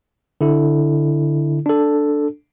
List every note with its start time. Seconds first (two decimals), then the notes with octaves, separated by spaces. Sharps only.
0.41 D3 E4 A4
1.66 D4 A4